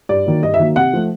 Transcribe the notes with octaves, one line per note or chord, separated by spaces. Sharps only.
G2 D5
D#3 F#3 A#3
G2 D#5
E5
D#3 F#3 A#3
C3 F#5
F3 A3